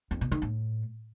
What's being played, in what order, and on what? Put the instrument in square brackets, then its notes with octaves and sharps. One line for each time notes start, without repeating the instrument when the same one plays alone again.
[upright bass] F2
B2
D#3
A2